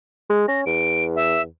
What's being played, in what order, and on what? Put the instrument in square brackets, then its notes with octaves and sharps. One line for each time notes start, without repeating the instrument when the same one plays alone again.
[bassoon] G#3
[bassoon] C#4 [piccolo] A#6
[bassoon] E2 [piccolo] D7
[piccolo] E5